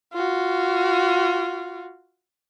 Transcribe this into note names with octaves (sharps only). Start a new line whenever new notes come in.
F4 F#4